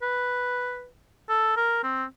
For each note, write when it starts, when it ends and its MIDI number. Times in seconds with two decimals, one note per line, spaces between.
0.02 0.87 71
1.29 1.55 69
1.57 1.80 70
1.83 2.04 60